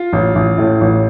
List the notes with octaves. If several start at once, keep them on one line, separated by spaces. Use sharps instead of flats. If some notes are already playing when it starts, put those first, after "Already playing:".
Already playing: F4
A1
A1
A2
A1